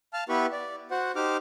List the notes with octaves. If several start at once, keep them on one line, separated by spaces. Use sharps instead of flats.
F5 A5 F6
B3 E4 G4 B4 B5 C#6
D5
F#4 C5 F#5
D#4 G4 C5 D6 F6